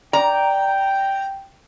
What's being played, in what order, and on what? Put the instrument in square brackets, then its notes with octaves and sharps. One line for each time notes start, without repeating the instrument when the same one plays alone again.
[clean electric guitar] D5 [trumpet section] G5 [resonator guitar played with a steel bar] A#5